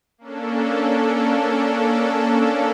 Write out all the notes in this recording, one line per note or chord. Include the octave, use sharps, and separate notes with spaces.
A#3 C#4 D4 A4